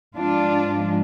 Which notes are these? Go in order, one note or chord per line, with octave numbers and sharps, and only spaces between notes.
G#2 F3 G#3 D4 F4